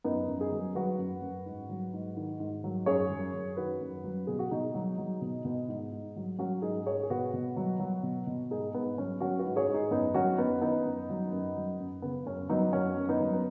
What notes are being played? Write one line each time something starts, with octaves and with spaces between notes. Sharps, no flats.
F#2 B3 D#4
F#2
D#4 G#4
F#3
F#3 F#4 B4
F#2
F#2
G#2
F#3
G#2
D#3
G#2
F#3
F#2 G#4 C#5
F#3
F#2
D#3 F#4 B4
F#2
F#3
B2 G#4
F#4
B2 D#4 G#4
F#3
F#3
B2
B2
G#2
G#2
F#3
F#3 C#4 F#4
G#2 D#4 G#4
G#2 G#4 C#5
G#4
B2 F#4 B4
B2
F#3
F#3
B2
B2
G#2 D#4 G#4
G#2 B3
F#3 C#4
F#3 C#4 F#4
F#4 B4
G#2
G#4 C#5
G#2
D#4 G#4
F#2 B3 D#4
F#3 C#4 F#4
F#2 B3 D#4
D#3 B3 D#4
F#2
F#3
F#2
F#3
F#2
C#3 B3
F#2 C#4
F#3 B3 D#4
F#2 C#4 F#4
F#2
B3 D#4
F#3
B3